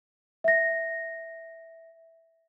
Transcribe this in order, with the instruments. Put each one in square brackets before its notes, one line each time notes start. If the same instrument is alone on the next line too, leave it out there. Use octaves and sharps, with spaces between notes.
[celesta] E5 A#6